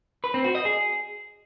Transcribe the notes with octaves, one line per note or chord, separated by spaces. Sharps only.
B4
C4
F#4
D#5
G#4